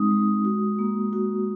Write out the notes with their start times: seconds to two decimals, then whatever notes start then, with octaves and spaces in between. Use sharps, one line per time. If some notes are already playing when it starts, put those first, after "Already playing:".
Already playing: G#3 C4 D#4 D#6
0.11 G#3
0.45 F#4
0.79 A#3
1.13 F#4